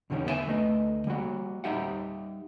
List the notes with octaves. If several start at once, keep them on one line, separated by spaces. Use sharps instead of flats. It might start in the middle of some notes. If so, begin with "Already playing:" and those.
E2 D3 D#3 G3 C#4
D#3 A#3 B3 E4 E5 G#5
D2 A3 B4 D#5
G3 A#3 F#4
G3 D#4 G4 E5 F#5